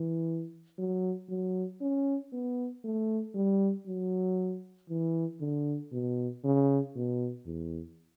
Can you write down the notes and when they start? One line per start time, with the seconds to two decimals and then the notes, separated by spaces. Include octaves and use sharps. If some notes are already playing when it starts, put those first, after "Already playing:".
Already playing: E3
0.78 F#3
1.29 F#3
1.81 C#4
2.33 B3
2.84 A3
3.35 G3
3.87 F#3
4.90 E3
5.40 D3
5.92 B2
6.44 C#3
6.95 B2
7.46 E2